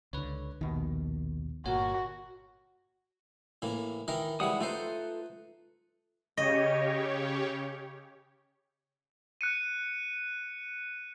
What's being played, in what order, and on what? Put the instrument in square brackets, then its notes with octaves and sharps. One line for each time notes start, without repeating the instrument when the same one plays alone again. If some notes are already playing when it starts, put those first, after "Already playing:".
[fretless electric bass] C#2 D3 [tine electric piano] B4 C#5
[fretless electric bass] A#1 D#3 [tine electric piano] D#2 B2
[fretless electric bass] G1 A#2 [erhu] F#4 [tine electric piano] A#4 C#5
[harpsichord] A2 E3 A#3
D#3 E3 A#4
[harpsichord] E3 G3 [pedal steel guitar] G#3 F#5 D#6
[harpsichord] A3 D#4 C5 [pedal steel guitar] F4 A4 B4
[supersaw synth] C#3 G4 C#5 [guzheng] D#5
[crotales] F#6 C#7 D#7